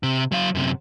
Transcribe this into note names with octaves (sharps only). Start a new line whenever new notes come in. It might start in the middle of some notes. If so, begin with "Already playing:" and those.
C3
F#3 F5
F#2 C3